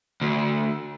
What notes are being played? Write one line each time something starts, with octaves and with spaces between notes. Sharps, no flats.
D2